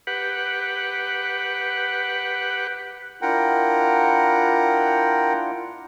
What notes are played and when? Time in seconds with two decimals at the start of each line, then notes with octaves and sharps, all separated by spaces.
0.07 G4 B4 F#5
3.22 D4 E4 F4 A#4 F#5 G5